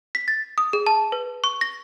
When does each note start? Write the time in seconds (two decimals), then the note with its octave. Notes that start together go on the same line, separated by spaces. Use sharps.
0.15 B6
0.28 A6
0.58 D#6
0.73 G#4
0.86 A5
1.12 B4
1.44 C#6
1.61 A#6